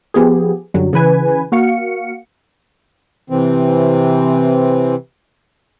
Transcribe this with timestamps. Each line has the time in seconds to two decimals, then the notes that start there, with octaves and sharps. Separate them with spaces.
0.14 F3 B3 G4 G#4
0.74 F#2 D3 F#3 G3
0.93 C#3 E3 B4 G#5
1.52 A#3 F#4 F5 C#7
3.30 C3 E3 C4